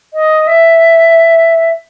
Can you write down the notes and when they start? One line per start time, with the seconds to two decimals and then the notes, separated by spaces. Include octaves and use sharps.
0.14 D#5
0.47 E5